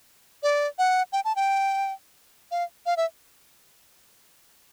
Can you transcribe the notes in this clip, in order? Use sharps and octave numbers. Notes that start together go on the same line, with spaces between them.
D5
F#5
G5
A5
G5
F5
F5
E5